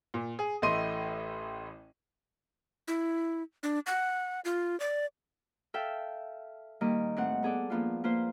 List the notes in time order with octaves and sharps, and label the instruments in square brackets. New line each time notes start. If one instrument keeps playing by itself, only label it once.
[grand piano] A#2
G#4
A1 A2 A3 D#5 C6 D#7
[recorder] E4
D4
F#5
F4
D5
[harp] A4 E5 F5 G5
D#3 G3 A#3 D#5
A2 C4 F#5
B3 G#4 A4 D5
F3 A#3 B3 D4 F4
A#3 F4 B4 C5